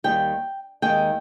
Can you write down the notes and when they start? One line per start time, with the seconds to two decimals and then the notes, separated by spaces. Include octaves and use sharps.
0.04 D#2 D#3 G3 G5
0.82 D#2 D#3 G#3 G5